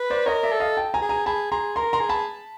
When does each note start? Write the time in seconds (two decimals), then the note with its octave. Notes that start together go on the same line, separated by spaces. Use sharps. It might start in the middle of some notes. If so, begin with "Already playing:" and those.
Already playing: B4
0.10 C5 D5
0.26 A#4 C#5 D#5
0.43 D5 E5
0.52 A4
0.60 D#5 F5
0.77 G5 A5
0.94 G#5 A#5
1.01 G#4
1.09 G#5 A#5
1.26 G#4 A5 B5
1.52 G#4 A#5 C6
1.76 A#4 A#5 C6
1.93 A#5 C6
2.01 G#4
2.09 A5 B5